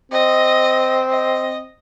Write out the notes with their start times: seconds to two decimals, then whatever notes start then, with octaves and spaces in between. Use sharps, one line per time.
0.12 C4 D#5
1.11 D#5